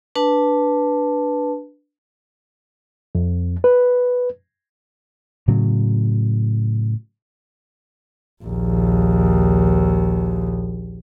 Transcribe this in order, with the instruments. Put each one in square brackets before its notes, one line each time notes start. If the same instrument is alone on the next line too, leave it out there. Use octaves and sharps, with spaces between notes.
[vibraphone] D4 B4 A5
[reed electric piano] F2
B4
[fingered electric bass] A2 C#3 F#3
[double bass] A#1 D#2